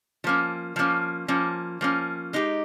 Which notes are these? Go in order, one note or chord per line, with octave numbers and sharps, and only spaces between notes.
F3 A#3 C#4
F3 A#3 C#4
F3 A#3 C#4
F3 A#3 C#4
G#3 D#4 G4